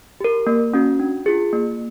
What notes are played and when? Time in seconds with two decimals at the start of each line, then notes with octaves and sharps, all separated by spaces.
0.20 G4 A#4
0.47 A#3
0.74 C#4 F#4
1.00 D4
1.26 F4 G#4
1.53 A#3